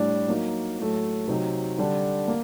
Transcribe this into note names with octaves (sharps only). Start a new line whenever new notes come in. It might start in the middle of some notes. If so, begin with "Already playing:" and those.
Already playing: A2 G3 D4
F#3 A#3 D#4
A2 F#3 A3
C3 F#3 C4 D#4
D3 G3 D4
A#3